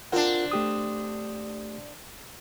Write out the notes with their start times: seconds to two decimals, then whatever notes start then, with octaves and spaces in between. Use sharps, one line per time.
0.12 C4 D4 F4 A#4 F#5
0.52 A3 G4 D#6